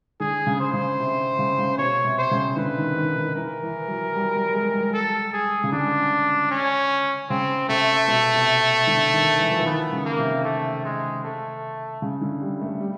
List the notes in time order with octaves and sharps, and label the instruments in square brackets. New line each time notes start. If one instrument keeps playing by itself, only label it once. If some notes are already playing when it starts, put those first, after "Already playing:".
[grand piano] D3 [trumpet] G#4
[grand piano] C#3
[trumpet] C5
[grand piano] C#3
C3
C#3
C#3
[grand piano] B2 [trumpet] C#5
[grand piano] C3
[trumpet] C5
[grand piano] C#3
[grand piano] D3 [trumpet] B4
[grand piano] D#3
D#3
D#3
[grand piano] E3 [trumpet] A#4
[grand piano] E3
F#3
G3
G3
G#3
G3
[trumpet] A4
G#4
[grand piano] C#3
[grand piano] D3 [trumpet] D4
[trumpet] C#4
[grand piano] C#3 [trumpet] C4
[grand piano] C3 [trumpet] A3
[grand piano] B2
C3
D3
D#3
E3
F3
E3
[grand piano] D#3 [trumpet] B3
[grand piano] C#3
[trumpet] A#3
[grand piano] C3
[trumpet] A3
G#3
A3
[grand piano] C#3
D3
G3
A3
G3